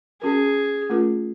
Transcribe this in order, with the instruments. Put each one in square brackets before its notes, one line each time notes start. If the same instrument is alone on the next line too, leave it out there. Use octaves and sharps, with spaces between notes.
[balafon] C#4 F#4 A#4 [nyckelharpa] G#4
[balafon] A3 C#4 F4 A#4